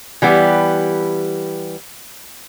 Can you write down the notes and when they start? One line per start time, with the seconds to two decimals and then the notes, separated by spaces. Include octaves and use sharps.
0.22 E3 G3 B3 G4